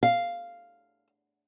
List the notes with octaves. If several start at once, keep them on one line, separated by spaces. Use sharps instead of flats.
F5